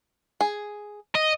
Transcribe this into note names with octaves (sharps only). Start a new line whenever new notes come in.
G#4
D#5